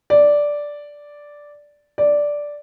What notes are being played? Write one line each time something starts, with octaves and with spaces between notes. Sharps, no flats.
D5
D5